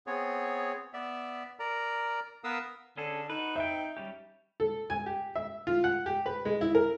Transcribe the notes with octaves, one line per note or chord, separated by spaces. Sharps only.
B3 C4 G#4 C#5
B3 D5 E5
A#4 D5 A#5
B3 A#4 B4 F5 D#6 E6
D3 C#4 G#4 A4
D#4 F#4 B4
C4 E5 G5
G3 C#4 G4
A4
G#5
G4
E5
F4
F#5
G4
B4
G#3
E4
A#4